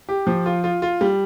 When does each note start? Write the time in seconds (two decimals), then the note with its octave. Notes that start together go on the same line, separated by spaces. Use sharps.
0.09 G4
0.27 F3
0.46 F4
0.64 F4
0.82 F4
1.01 G3